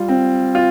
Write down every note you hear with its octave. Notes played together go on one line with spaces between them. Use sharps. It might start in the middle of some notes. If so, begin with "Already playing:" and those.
Already playing: G3 F4
C4
F4